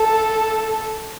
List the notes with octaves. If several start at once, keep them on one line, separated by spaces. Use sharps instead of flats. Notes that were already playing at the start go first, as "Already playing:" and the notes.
Already playing: A4